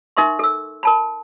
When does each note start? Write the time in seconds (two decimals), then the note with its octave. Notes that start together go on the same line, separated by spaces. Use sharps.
0.17 D#4 A#4 E5 C6 C#6
0.39 A4 E6
0.83 A#4 A5 B5